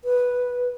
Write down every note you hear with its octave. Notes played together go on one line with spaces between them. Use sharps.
B4